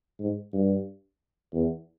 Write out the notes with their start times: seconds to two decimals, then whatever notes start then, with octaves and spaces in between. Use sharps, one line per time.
0.19 G#2
0.53 G2
1.54 E2